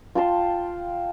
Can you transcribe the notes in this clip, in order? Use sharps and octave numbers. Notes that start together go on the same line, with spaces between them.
F4 G5 A5 C6